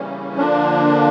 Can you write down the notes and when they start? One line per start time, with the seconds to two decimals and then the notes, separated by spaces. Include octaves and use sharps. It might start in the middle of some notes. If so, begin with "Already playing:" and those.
Already playing: C#3 E3 G3 A#3 C#4
0.38 D3 F3 A#3 D4